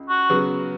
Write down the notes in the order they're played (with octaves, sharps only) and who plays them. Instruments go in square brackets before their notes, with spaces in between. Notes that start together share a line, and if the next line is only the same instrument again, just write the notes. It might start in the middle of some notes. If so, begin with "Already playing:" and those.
Already playing: [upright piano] C#2
[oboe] F#4
[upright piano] C#3 F#3 B3